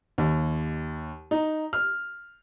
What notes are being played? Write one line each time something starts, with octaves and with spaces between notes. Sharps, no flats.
D#2
D#4
F6